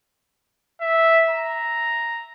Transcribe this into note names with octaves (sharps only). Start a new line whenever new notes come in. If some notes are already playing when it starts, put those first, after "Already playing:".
E5
A#5